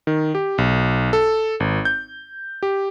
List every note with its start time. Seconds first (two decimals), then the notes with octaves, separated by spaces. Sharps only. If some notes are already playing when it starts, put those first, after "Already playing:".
0.07 D#3
0.35 G4
0.58 B1
1.13 A4
1.60 G#1
1.85 G6
2.63 G4